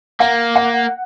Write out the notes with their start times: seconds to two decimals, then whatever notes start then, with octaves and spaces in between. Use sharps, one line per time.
0.20 A#3 F#5
0.56 F#5